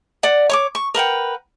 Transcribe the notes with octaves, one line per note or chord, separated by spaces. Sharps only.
D5 F#5
C#5 C#6 D6
C#6
A#4 B4 F#5 G5